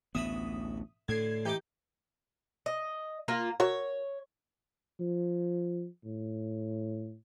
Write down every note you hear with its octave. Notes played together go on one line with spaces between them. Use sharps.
A1 D2 B3 E5 B5 D#6
A2 D3 G#6 C7
E3 D#4 G4 D6 G6
D#5
A#3 F4 A#4
F#4 A#4 C#5 E5
F3
A2